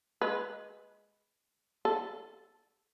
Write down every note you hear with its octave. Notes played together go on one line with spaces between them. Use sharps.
G#3 B4
A4